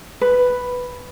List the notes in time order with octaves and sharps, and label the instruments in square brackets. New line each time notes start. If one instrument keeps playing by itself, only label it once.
[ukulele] B4